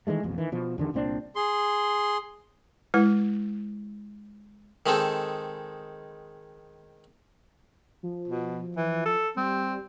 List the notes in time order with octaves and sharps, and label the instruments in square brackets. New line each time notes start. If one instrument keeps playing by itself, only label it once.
[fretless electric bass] D#3 E3 G#3 A3
A1 F2 B2
D#3 E3
B2 F3
E2 D3 D#3 G3
C2 A#2 C4 D4
[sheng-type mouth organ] G#4 C6
[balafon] G#3 E4 B4
[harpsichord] D#3 G#3 C4 A4
[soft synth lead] F3
[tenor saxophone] B2
E3
A4
[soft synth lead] G3 [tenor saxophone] C4